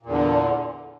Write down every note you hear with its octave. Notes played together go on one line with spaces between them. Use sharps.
E2 A#2 D3